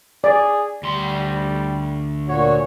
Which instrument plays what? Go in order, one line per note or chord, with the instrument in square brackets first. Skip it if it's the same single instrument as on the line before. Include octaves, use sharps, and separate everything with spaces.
[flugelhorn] G#4 [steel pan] D5
[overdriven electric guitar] D2 C6 [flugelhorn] G3
[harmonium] A#2 F#4 [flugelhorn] C#5